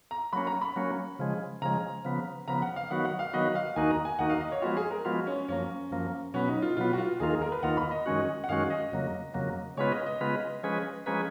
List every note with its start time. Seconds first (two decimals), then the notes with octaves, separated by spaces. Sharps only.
0.11 A#5
0.33 F#3 A#3 C#4 B5
0.47 A#5
0.61 B5
0.76 F#3 A#3 C#4
1.19 C#3 F3 G#3
1.62 C#3 F3 G#3 A#5
2.05 C#3 F3 B3
2.48 C#3 F3 B3 A#5
2.62 F#5
2.76 F5
2.90 D#3 F#3 B3 F#4 F#5
3.05 F#5
3.19 F5
3.33 D#3 F#3 B3 F#4 D#5
3.55 F5
3.76 D#2 D#3 A#3 D#4 F#4 G#5
3.91 A#5
4.05 G#5
4.19 D#2 D#3 A#3 D#4 F#4 F#5
4.30 F5
4.40 D#5
4.52 C#5
4.62 F3 G#3 B3 F4 F#4
4.77 G#4
4.91 A#4
5.05 F3 G#3 B3 F4 F#4
5.27 C#4
5.48 F#2 F3 A#3 C#4
5.91 F#2 F3 A#3
6.34 B2 F#3 B3 C#4
6.48 D#4
6.62 F4
6.77 B2 F#3 B3 F4
6.93 F#4
6.98 F4
7.20 D#2 D#3 A#3 F4 G#4
7.30 G#4
7.42 A#4
7.52 B4
7.63 D#2 D#3 A#3 F4 F#5
7.77 B5
7.91 D#5
8.06 F#2 D#3 G#3 C#4 F#4
8.44 F#5
8.48 F#2 D#3 G#3 C#4 F#4 F5
8.70 D#5
8.92 F2 C#3 F#3 A#3
9.34 F2 C#3 F#3 A#3
9.77 C#3 G#3 B3 F4 B4 C#5
9.92 D#5
10.06 D#5
10.21 C#3 G#3 B3 F4 B4
10.63 F3 G#3 C#4 G#4 B4
11.06 F3 G#3 C#4 G#4 B4 A#5